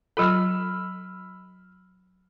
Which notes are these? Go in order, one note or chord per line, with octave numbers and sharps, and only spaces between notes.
F#3 F4 A4 B5 E6 F6